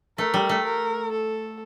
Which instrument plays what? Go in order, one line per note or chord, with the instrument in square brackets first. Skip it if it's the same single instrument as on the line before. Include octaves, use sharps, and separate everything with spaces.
[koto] A3 [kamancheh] A#4
[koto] G3
A3
[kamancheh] A#4
A4